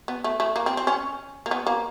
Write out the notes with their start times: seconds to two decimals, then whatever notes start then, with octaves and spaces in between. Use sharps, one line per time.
0.08 B3
0.24 A3
0.40 A3
0.56 A#3
0.66 C4
0.77 C4
0.87 C#4
1.46 A#3
1.51 B3
1.67 A#3